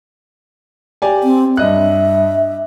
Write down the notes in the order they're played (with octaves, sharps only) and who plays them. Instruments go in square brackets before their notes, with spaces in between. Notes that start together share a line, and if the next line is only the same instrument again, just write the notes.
[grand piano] G4 D5 G#5
[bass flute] C4
[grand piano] G2 D#5 F#6 [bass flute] E5